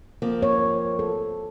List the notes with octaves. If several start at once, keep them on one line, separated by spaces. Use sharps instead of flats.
F3 A#3 C4
C#5
A4